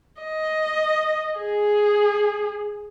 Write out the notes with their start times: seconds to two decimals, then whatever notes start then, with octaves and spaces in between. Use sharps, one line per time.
0.21 D#5
1.39 G#4